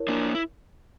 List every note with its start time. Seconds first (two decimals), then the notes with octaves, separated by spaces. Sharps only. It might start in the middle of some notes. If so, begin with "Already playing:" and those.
Already playing: E4 A#4 C#5
0.08 A#3 D4
0.35 E4